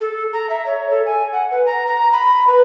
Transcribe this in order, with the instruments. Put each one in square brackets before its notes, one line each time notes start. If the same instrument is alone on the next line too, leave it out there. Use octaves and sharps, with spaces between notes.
[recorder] A4
A#5
E5
C#5
A4
G#5
F#5
B4
A#5
A#5
B5
B4